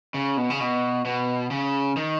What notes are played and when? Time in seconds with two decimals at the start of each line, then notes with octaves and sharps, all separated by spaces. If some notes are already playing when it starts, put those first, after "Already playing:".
0.14 C#3
0.37 B2
0.50 C#3
0.60 B2
1.05 B2
1.51 C#3
1.96 D#3